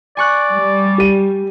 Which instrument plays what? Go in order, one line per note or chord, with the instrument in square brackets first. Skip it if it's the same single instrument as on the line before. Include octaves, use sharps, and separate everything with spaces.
[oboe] D5 [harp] G#5 C#6 F#6
[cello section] G3
[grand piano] G4 D#7